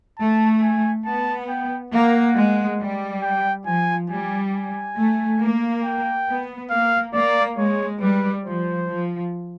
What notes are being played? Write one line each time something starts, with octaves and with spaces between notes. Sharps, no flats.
A3 A5
G#5
B3 A5
G5
A#3 F#5
G#3
G3
G5
F3 G#5
G3 G#5
G#5
A3
A#3
G5
B3
A#3 F5
A#3 D5
G#3 C#5
G3 B4
F3 C5
F3